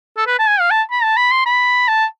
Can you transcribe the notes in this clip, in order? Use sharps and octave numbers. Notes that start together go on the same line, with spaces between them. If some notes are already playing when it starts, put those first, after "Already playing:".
A4
B4
A5
G#5
F5
A5
B5
A5
B5
C6
B5
A5